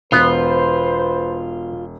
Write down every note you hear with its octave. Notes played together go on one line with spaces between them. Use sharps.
E1 B3 F4 B4 C5